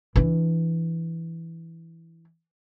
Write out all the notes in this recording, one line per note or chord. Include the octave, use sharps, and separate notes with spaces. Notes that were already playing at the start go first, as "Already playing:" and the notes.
E3 D4